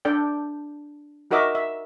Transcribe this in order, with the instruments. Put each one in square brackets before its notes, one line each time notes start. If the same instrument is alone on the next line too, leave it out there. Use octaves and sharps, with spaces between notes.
[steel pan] D4 A4 D5 G5
D#4 F#4 A#4 D#5 E5 D6
E5